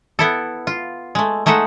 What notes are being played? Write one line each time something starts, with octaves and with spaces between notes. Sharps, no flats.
B3 E4 A4
F4
G#3 A3
G#3 A3 D#4 E5 F#5